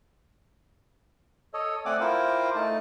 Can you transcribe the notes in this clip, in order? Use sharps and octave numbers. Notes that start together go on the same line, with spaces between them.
A4 C#5 D#5
A3 C4 D5 F#5 G#5 D6
E4 F4 A#4 C5 G5 D6
A3 D#4 A5